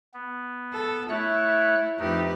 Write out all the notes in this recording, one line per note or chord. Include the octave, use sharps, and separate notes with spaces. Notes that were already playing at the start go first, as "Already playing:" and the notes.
B3
A4
A3 E4 C#5 F#6
F2 A3 D#4 G4 B4